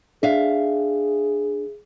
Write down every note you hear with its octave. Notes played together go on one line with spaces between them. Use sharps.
D4 G#4 E5 F5